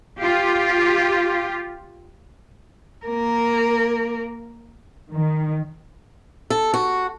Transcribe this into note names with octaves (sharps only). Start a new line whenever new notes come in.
F4 G4
A#3 A#4
D#3
A4
F#4